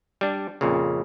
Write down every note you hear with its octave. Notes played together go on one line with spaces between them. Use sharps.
G3 D4
F2 A#2 C#3